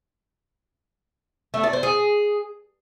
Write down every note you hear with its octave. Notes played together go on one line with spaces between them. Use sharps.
A3
D5
C5
G#4